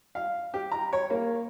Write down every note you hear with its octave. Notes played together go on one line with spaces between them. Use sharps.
F5
G4
A#5
C#5
A#3